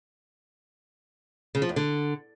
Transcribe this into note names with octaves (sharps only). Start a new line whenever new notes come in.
C#3
F3
E2
D3